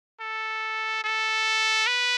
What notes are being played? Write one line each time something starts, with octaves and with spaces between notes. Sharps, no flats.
A4
A4
B4